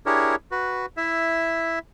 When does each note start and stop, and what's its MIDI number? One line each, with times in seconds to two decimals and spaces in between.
0.06 0.35 62
0.06 0.35 64
0.06 0.35 67
0.06 0.35 68
0.06 0.35 70
0.06 0.35 73
0.51 0.86 66
0.51 0.86 71
0.97 1.79 64
0.97 1.79 76